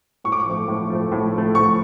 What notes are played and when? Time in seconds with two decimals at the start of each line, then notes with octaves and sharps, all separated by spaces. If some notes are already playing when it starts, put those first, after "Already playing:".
0.24 A2 C#6
0.32 D6
0.40 C#6
0.46 F3 A3
0.68 A2
0.90 F3 A3
1.12 A2
1.33 F3 A3
1.55 A2 C#6